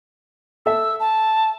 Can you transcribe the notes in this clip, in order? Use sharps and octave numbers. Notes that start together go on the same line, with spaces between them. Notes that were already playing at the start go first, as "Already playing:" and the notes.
A4 E5 E6
A5